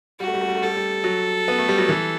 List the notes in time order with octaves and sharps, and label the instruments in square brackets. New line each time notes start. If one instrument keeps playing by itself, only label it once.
[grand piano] G3 [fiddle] F#4
[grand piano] A3
G3
A3
G3
A3
[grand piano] G3 [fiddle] A4
[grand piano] A3
G3
F#3
B3
A3
G3
F#3
E3